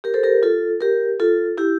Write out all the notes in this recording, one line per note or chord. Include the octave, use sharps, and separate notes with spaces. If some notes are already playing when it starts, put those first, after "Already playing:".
G4 A#4
A4 C5
G4 A#4
F4 A4
G4 A#4
F4 A4
E4 G4